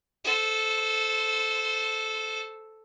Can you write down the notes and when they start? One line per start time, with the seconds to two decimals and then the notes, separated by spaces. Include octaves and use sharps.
0.24 A4 C5